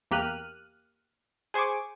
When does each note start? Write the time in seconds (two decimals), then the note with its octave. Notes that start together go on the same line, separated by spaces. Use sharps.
0.11 E2 A#3 G4 F6 F#6 D#7
1.54 G#4 C5 G#5 C#6 D6